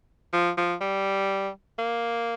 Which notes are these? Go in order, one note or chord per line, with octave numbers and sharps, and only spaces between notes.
F3
F3
G3
A#3